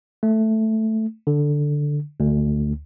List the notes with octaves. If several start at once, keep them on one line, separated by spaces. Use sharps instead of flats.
A3
D3
D2